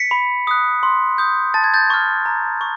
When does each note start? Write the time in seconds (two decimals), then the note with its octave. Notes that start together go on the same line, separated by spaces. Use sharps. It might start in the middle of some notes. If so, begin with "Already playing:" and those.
Already playing: B6 C#7
0.11 B5
0.47 D#6 F#6
0.83 C6
1.18 D#6 G6
1.54 A5 A6
1.64 G#6
1.74 G6 A6
1.90 C#6 F6
2.26 A#5
2.61 C#6